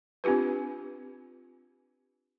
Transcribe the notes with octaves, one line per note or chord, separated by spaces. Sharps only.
C4 D4 F4 G4 B4